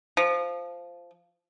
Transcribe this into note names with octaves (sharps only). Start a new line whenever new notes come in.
F3